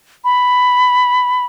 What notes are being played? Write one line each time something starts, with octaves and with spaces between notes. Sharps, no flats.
B5